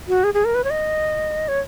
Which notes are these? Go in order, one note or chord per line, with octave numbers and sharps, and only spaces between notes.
F#4
G#4
G#4
A#4
B4
C#5
D#5
C#5